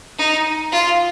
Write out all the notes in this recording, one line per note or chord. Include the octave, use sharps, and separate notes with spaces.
D#4
F4